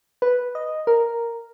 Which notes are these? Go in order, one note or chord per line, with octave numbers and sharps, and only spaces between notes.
B4
D#5
A#4